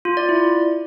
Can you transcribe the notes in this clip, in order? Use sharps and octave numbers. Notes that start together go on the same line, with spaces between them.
F4
D5
E4